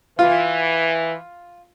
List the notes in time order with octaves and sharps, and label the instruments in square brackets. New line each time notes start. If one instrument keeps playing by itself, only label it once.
[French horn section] E3 [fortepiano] F4